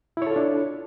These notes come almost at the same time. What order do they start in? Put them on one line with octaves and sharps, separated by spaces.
E4 C#5 A4 F4 D4